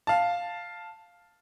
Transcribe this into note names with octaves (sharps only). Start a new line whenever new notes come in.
F5 A5